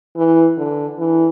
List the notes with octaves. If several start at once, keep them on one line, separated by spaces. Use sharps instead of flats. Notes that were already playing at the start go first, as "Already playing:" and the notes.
E3
D3
E3